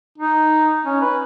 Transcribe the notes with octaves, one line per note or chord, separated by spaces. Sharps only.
D#4
C#4
B4